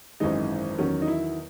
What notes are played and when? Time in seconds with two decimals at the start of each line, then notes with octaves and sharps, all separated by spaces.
0.20 G#1 F#2 E3 G#3 D#4
0.78 E2 D#3 F#3 C#4
1.02 D#4
1.08 E4